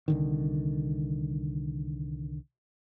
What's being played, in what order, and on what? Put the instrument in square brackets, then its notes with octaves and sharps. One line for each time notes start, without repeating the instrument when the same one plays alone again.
[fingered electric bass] C2 D3 D#3